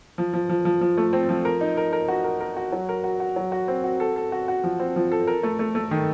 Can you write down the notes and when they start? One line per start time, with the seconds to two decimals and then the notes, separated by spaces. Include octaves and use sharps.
0.18 F3
0.33 F3
0.49 F3
0.65 F3
0.81 F3
0.97 A3
1.13 C4
1.29 F3
1.45 A#4
1.61 D#4
1.77 A#4
1.93 A#4
2.08 F#4
2.24 A#4
2.40 A#4
2.57 F#4
2.72 F#3
2.89 A#4
3.04 F#4
3.20 F#4
3.36 F#3
3.52 F#4
3.68 C4
3.84 F#4
4.00 A4
4.16 A4
4.32 F#4
4.48 F#4
4.64 F3
4.79 C4
4.96 F3
5.12 A4
5.27 A#4
5.43 A3
5.59 A3
5.75 A3
5.91 D#3